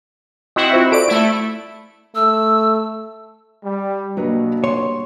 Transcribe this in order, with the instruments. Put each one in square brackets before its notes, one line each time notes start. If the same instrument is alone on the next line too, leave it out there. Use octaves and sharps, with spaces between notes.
[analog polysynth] C4 E4 F#4 [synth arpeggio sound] D#5
[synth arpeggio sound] F4 C5 E5
[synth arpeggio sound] A4 D5 [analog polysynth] D7
[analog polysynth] A3 E4
[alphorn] A3 [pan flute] E6
[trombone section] G3
[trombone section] G2 B2 [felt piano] F#3 B4 [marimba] A#3 D4
[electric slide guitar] C#5 [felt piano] C6